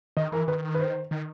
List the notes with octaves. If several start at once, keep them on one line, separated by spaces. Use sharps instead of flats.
D#3 D#5
E3 A#4
D#3 B4
B4
C5
D#3